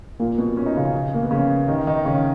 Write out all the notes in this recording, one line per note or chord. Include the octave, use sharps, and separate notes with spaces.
A#2 A#3
B2 B3
C#4
D#4
C#3 C#4
A#3
B3
C#3 C#4
D#3 D#4
D#3 D#4
C#3 C#4